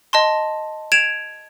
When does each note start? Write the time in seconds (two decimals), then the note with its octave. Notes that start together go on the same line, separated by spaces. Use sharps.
0.13 D#5 A5 C6
0.92 G#6 D7 E7 F7